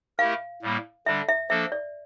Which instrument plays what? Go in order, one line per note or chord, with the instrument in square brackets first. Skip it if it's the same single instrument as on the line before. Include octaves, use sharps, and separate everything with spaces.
[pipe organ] A3 E4 G4 A#4 [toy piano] F5
[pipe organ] A2 G3 A#3
[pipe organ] D3 G3 D4 [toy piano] E5
[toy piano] E5
[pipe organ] F3 A#3 D4 A4 [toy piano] E5
[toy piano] D5